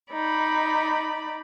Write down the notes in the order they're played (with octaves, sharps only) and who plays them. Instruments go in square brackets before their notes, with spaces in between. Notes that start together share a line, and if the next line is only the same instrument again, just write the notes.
[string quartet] D#4 D5 B5